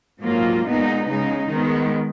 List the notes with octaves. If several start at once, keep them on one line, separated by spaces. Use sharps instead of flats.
G#2 F#3 A#3 F4
A#2 G#3 B3 D#4
C#3 G#3 D#4
D#3 G#3 B3